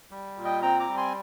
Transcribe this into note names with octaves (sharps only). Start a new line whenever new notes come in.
G3
A#2
D#5 G5
C4 G5 A#5
A#5 D6
G3
G#5 C6